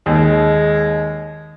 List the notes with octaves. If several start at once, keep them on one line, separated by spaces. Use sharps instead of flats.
D#2 G#3